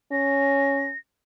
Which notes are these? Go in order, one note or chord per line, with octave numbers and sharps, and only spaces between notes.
C#4 A#6